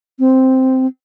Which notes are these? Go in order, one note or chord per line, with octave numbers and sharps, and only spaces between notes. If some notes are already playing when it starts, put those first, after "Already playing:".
C4